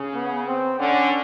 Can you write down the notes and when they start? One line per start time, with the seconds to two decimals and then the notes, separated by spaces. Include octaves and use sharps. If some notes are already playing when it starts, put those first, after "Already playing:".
Already playing: C#3
0.14 B3
0.47 C4
0.79 D3 C#4